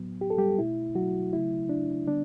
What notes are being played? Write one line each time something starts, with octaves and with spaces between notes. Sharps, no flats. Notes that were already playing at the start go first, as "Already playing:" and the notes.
Already playing: A2 F#3 B3
G4
A4
G3 G4
B2 A3 E4
F#3 F#4
C#3 F#3 A3 E4
D4
D3 G3 B3 D4